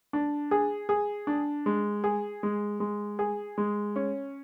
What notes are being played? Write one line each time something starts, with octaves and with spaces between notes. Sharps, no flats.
D4
G#4
G#4
D4
G#3
G#4
G#3
G#3
G#4
G#3
C#4